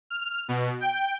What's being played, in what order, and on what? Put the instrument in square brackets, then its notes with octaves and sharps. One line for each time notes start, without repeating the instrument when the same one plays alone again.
[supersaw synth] F6
B2
G5